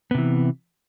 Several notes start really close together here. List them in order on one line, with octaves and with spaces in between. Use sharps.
B3 C3 E3